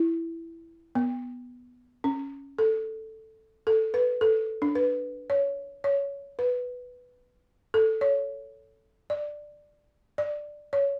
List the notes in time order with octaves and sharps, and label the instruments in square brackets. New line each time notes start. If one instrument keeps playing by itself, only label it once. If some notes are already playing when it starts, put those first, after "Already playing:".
Already playing: [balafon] E4
B3
C#4
A4
A4
B4
A4
D4
B4
C#5
C#5
B4
A4
C#5
D5
D5
C#5